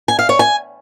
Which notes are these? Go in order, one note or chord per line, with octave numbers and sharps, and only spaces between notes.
G#5
F5
C#5
G#5